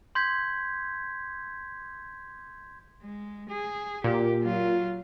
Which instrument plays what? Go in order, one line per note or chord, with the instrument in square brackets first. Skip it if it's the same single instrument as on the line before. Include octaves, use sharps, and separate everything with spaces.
[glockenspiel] C6 G6 G#6 B6
[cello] G#3
G#4
[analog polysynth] A#2 [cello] G4
[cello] F#3 F4